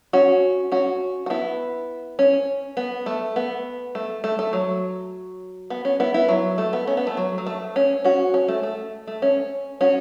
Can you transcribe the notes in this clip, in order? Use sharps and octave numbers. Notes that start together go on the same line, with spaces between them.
C#4 F#4
C#4 F#4
F#4
B3 E4
C#4
B3
A3
B3
A3
A3
A3
F#3
B3
C#4
B3 E4
B3 E4
F#3
A3
B3
C#4
B3
A3
F#3
F#3
A3
C#4
C#4 F#4
C#4
A3
A3
A3
C#4
C#4 F#4